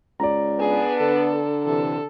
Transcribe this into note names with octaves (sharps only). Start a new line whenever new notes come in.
C#2 D5 A#5
B3 D4 G#4 B4
D3 A4
C3 E3 A4